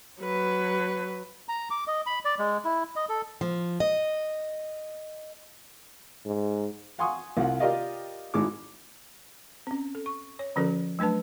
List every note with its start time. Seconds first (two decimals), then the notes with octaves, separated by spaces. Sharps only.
0.21 F#3 B4
1.49 A#5
1.71 D6
1.87 D#5
2.06 B5
2.25 D5
2.39 G#3
2.64 E4
2.96 D#5
3.09 A4
3.41 F3
3.80 D#5
6.26 G#2
6.98 F5 F#5 G#5 C6 C#6 D#6
7.37 C2 F4 F#5
7.60 F4 G4 A#4 D5 D#5 F5
8.34 G#1 A2 G#3 D6
9.67 C4 C#4
9.95 A4
10.06 C#6
10.39 C#5
10.56 D3 F3 C#4 F#4 A4 A#4
10.99 F#3 A3 D4 B4 A5